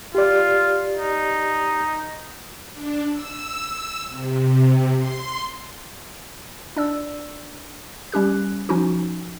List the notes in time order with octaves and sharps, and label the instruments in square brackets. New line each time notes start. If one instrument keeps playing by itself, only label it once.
[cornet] F4 [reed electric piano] G4 D5
[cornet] D#4
[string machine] D4
E6
C3
C6
[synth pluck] D4 D5 E6
G3 C#4 G4 F#6
F3 C#4 D#4 F#4